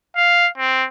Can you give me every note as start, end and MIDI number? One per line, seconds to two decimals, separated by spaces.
0.17 0.48 77
0.58 0.85 60